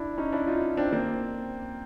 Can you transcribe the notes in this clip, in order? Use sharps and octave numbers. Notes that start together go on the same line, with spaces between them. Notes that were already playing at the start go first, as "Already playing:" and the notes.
Already playing: D4 E4
C#4 D#4
D4 E4
D#4 F4
C4 D4
A#3 C4